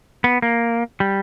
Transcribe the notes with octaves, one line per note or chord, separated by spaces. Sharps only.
B3
A#3
G3